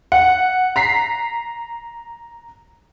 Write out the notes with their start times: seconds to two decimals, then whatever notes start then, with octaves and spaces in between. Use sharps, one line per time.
0.12 F#5
0.76 A#5 B6 C7